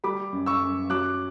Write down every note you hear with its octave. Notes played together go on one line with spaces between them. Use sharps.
G3 B5 D6
F#2
C#6 E6
F#2
F#3 D6 F#6